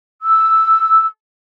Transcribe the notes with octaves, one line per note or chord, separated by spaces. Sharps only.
E6